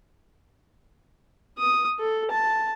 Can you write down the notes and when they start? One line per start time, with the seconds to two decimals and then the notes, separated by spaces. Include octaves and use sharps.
1.59 D#6
1.99 A4
2.31 A5